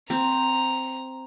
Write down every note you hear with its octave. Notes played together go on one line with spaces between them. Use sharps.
C4 A#5